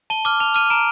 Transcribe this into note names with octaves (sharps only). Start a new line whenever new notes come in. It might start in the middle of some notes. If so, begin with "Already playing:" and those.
A5 G7
D6 F6 G7
A5 F7
D6 F6 D#7
A#5 D7